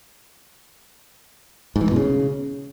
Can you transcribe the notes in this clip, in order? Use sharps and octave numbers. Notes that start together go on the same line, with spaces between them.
G#2
E3
G#2
B2
C#3